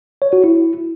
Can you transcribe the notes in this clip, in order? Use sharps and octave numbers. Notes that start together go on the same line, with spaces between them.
C#5
F#4
E4